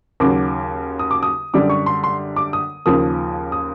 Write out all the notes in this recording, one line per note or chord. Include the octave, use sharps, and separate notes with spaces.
D#2 C#3 F#3 D6
D#6
D6
D#6
F#2 D3 G3 D6
C#6
C6
C6
D6
D#6
D#2 C#3 F3 A#3 D#6
D#6